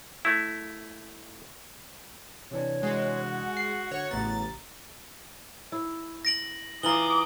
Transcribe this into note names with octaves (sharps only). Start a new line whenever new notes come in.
A3 E4
C3 E3 D4 C#5
G#3 F#4
F#5
C7
D3 C#5
A1 C#3 A3 B3 A#5 A6
E4
A#6 D7 F#7
E3 F4 A#5 D6 D#6 F#7 G7